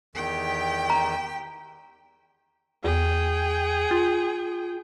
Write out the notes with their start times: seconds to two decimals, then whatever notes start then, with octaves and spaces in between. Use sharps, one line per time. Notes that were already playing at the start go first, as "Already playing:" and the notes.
0.15 E2 D#3 G4 G5
0.90 A#5
2.84 E2 G#4 G5
3.91 F4